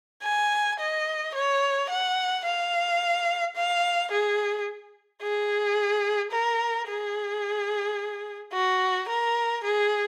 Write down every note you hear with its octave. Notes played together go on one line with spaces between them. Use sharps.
G#5
D#5
C#5
F#5
F5
F5
G#4
G#4
A#4
G#4
F#4
A#4
G#4